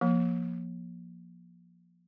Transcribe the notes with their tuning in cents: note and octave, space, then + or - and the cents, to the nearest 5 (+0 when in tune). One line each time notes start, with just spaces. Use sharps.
F3 +0 A#3 +25